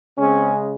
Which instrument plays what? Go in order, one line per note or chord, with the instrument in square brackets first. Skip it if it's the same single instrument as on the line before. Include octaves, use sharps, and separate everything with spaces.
[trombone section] C#3 G#3 C4 C#4